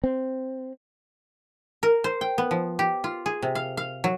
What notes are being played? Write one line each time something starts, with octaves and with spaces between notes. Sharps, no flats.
C4
A#4
C5
G5
B3
F3
G4
F4
G#4
C3
F5
F5
F#3